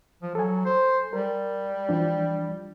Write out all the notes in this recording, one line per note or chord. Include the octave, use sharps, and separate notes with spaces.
F3
F#3 A4 G#5
C5
G3 A#4
E3 F3 D4